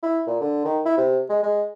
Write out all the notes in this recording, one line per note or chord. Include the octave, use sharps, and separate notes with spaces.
E4
A#2
D3
D#3
E4
C3
G#3
G#3